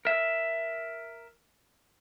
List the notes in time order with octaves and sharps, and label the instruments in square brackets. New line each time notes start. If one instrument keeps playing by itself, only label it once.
[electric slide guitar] A#4 E5